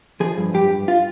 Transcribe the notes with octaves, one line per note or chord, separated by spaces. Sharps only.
F3 G#4
G2
G2 G4
G2
F4